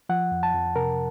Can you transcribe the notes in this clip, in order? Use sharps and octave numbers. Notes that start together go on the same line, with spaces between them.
F3 F#5
F2
A5
F2
C3 A#4